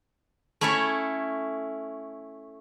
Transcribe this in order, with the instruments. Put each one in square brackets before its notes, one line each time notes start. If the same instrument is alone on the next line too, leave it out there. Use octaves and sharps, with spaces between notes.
[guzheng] A3 C#4 E4 A4 C#5